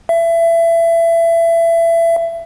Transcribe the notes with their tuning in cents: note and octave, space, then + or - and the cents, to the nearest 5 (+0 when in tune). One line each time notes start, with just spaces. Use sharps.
E5 +25